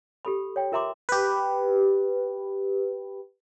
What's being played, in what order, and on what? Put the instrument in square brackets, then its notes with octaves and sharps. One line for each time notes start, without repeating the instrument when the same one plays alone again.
[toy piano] G4 A4 B5
C#5 G5
F4 A#4 E5 A#5 C6 D6
[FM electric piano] G4 B4